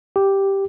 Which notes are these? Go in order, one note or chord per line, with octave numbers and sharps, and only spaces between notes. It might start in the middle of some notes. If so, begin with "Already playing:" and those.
G4